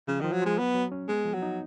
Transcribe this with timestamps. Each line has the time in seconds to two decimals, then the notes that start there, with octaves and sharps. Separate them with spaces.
0.08 C#3 F3
0.21 D#3 F3
0.33 F#3
0.42 F3 G#3
0.58 F#3 B3
0.75 F#3
0.92 C#4
1.08 G#3 B3
1.25 F3
1.34 F#3
1.42 D#4